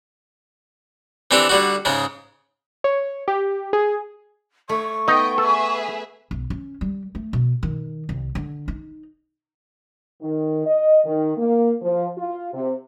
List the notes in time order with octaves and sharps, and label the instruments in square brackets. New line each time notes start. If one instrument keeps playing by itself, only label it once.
[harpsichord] E3 C4 D4 G4 A4
D3 G3 F#4
G#2 C#3 G#3
[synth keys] C#5
G4
G#4
[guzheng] A3 [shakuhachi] C#6
[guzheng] B3 [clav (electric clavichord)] D#4 [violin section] D#5 G5
[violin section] G#4 B4 E5 [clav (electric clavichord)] A4
[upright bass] B1
C#4
G3
A3
B2
D#3
C2
D3
D#4
[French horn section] D#3
D#5
D#3
A#3
F3
F4
C3